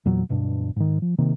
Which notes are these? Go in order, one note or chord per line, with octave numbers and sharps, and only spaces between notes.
E2 A#2 F#3
D1 G2 B2 D4
G#2 D#3
F3
C3 D#3 A#3